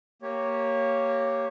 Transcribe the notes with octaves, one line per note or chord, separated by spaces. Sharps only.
A#3 G4 C#5